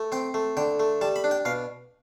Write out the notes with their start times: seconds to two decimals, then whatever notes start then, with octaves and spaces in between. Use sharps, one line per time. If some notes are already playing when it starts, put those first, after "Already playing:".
Already playing: A3
0.12 C4 G5
0.34 A3
0.57 D3 G5
0.80 A3
1.01 G3 A5
1.16 B5
1.24 D4
1.31 G5
1.45 B2 F5